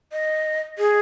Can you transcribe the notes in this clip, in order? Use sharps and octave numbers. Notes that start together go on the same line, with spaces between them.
D#5
G#4